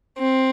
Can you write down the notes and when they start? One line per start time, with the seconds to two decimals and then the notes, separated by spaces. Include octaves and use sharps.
0.18 C4